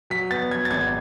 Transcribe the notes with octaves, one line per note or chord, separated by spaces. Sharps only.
F#3 B6
B3 A6
F#3 G#6
A6
G#1 G#6